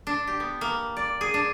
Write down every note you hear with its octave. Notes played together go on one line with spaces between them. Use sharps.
D4
G4
B3
A#3
D5
G#4
D4